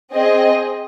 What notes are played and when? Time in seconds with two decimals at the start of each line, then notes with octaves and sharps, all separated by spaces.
0.13 C4 G#4 D#5